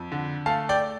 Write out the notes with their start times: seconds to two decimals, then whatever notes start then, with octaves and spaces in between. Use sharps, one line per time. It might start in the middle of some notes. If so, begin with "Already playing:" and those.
Already playing: F2
0.12 D3
0.46 A3 F5 A5
0.69 D5 G5